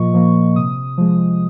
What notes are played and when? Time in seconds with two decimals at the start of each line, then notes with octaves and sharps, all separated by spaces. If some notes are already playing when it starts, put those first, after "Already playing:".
Already playing: A#2 F3 A#3 D#5 C#6
0.14 F3 A#3
0.56 C3 D#6
0.98 F3 G#3